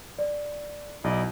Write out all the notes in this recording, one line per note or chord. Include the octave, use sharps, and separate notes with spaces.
D5
B1 E4 D5 D#5